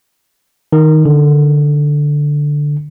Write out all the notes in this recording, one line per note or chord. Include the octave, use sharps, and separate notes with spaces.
D#3
D3